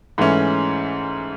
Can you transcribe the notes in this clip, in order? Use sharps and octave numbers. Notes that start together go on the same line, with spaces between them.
G#2 E3 A3 C#4